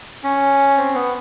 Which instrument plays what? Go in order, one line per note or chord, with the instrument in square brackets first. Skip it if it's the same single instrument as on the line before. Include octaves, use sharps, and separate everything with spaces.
[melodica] C#4
C4
B3